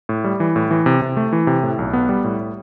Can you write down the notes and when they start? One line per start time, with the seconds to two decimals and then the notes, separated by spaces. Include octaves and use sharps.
0.09 A2
0.24 G3
0.40 E3
0.56 A2
0.71 E3
0.86 C3
1.02 C3
1.17 A3
1.33 E3
1.47 C3
1.63 A2
1.79 B1
1.93 B3
2.09 G3
2.24 A2